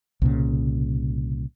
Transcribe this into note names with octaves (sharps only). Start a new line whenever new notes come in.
C2 A#2 C#3